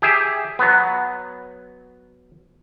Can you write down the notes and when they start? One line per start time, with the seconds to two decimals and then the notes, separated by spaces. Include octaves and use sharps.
0.02 G4 G#4 E5
0.59 F#3 B3